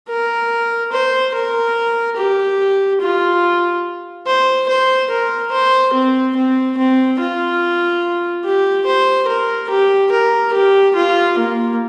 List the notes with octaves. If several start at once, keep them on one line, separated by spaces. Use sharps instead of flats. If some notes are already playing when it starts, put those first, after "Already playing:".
A#4
C5
A#4
G4
F4
C5
C5
A#4
C5
C4
C4
C4
F4
G4
C5
A#4
G4
A#4
G4
F4
A#3